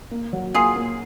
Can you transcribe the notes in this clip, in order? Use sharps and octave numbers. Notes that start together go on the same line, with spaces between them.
A#3
F#3
A#3 F4 G#4
A#3